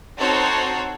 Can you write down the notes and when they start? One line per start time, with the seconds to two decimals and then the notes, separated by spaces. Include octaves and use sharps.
0.17 C4 D#4 F#4 A4 C5 C#5